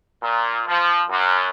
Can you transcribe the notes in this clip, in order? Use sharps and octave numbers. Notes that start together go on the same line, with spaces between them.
A#2
F3
F#2